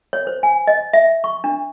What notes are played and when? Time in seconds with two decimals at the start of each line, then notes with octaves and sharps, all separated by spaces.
0.13 C#5
0.27 C5
0.43 G#5
0.67 D#5
0.93 E5
1.24 C#6
1.44 D4